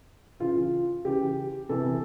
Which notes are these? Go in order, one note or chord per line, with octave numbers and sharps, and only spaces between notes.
C#3 E3 F4
C#3 E3 G4
C3 E3 A4